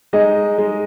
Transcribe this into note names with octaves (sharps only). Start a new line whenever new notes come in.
G#3 D#4 D#5
G#3